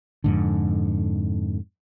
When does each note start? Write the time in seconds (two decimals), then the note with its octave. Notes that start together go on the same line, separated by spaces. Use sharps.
0.24 F2 G#2 D3